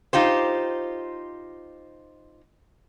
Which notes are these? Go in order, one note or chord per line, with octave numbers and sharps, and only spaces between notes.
D#4 F4 G4 C5